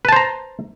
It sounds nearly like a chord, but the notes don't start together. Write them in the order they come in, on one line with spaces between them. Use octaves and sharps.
B4 A5 C5 A#5